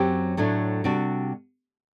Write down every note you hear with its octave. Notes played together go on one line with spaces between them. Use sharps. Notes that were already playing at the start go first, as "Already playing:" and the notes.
Already playing: F#2 F#3 C4 G4
A2 F#3 A3 D4
C3 G3 D4 F#4